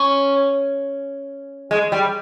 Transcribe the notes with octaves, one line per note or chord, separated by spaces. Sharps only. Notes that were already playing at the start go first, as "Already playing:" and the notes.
Already playing: C#4
G#3
G3